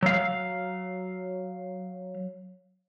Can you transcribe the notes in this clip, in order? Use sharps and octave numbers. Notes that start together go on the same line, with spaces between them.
F#3 F5